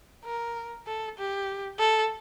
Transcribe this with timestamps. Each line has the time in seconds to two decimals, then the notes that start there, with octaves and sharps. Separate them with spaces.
0.25 A#4
0.87 A4
1.18 G4
1.79 A4